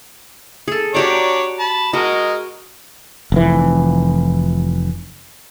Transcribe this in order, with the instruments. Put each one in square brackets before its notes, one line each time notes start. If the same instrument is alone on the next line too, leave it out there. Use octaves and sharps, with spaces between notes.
[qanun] G#4 A4
[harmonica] D4 C#5 D5 [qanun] F#4 G4 A#5
[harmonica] A5 B5
[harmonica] G#3 A#4 D#5 [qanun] F#4
[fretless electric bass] F1 E3